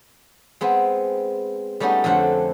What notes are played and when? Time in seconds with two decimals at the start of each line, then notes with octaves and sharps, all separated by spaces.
0.61 G#3 B3 C4
1.80 G3 A3 B3 C#4 D#4
2.04 F2 D3 A3 C4 F#5